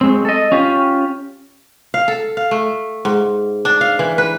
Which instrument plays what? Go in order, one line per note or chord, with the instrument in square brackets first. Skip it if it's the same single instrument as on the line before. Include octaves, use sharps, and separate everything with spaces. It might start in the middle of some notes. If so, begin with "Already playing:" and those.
[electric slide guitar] F#3 G#3 C4
A4 D#5
C#4 F4 G4
[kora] F5
A4
F5
A3
G#2
D4
F5
E3
B4